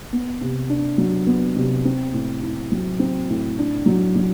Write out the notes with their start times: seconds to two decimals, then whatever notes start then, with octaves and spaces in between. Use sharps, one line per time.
0.13 B3
0.41 C3
0.69 D4
0.98 F#3
1.27 B3
1.56 C3
1.85 C4
2.13 A2
2.43 E4
2.72 F#3
2.99 C4
3.29 A2
3.58 D4
3.86 F#3
4.16 F#3